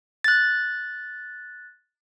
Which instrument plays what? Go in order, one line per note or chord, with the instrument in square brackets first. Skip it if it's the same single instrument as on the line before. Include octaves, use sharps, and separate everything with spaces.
[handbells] F#6 A6